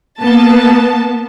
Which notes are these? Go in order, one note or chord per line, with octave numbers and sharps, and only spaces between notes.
A#3 B3 A5